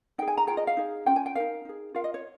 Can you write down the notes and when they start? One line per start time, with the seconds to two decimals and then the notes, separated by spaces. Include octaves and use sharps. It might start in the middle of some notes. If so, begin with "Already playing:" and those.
0.18 D#4 G5
0.22 G#4
0.28 G#5
0.37 A#5
0.47 F4 G#4 G5
0.57 D#5
0.67 F5
0.77 D#4 G#4
1.06 C#4 F4 G5
1.16 G#5
1.26 G5
1.35 D#4 A#4 F5
1.65 D#4 G#4
1.95 F4 A#4 F5
2.04 D#5
2.14 C#5